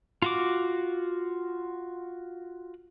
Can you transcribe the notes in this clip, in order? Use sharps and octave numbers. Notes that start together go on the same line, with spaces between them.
F4 F#4 D6